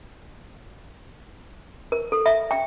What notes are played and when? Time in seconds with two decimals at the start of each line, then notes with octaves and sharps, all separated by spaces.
1.92 A#4
2.12 A4
2.26 E5
2.51 G5